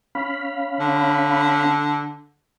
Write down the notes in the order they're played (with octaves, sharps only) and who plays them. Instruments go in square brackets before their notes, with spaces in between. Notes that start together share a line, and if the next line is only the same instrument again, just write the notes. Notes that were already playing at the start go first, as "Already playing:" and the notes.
[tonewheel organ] C#4 F5 B5
[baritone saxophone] D3